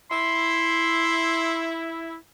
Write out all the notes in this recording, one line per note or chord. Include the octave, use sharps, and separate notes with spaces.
E4 C6